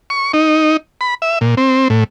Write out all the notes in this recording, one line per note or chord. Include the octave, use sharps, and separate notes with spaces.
C#6
D#4
B5
E5
A#2
C4
A2